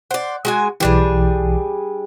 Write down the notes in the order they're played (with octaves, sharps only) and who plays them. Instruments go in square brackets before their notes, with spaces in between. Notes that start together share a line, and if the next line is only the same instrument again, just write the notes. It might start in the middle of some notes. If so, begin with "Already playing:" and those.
[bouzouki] C5 D5 [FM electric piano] F#5
[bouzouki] G#3 F#4 G#5
[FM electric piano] B1 E3 [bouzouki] G3 D4 G#4